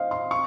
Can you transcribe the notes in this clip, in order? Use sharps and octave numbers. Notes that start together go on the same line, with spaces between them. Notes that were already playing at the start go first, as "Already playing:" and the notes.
Already playing: C5 D#5 F5
C6
C#6